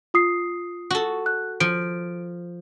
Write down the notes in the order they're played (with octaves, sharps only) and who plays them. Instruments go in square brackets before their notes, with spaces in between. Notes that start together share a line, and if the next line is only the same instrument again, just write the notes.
[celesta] F4 D#6 C7
[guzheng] F#4 A4
[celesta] F#6
[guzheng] F3 [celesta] D7